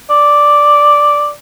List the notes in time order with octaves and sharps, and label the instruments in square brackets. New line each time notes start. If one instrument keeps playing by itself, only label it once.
[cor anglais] D5